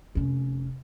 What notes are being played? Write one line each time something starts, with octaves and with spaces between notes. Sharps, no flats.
F1 C#4